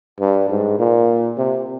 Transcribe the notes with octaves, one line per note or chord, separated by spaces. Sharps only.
G2
G#2
A#2
C3